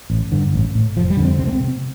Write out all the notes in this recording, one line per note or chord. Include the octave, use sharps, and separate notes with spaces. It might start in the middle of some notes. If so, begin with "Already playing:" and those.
A1
G2 D3
A1
A2
F1 F3
G3
F2 D3
C4
C2 C4
A3
C4
C3